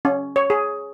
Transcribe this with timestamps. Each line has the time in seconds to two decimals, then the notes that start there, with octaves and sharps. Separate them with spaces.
0.05 C#4
0.36 C#5
0.50 G#4